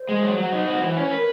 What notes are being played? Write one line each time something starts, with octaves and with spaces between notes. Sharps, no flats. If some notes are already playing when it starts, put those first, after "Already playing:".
Already playing: C5
G#3
F#3
F#3
D#4
F#4 C5
E3
C#4
A#4 B4